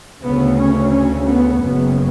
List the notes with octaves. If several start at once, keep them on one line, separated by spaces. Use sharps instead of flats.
D2 C#3 B3
C#4
C#4
B3
F#1 F#2 C#3 B3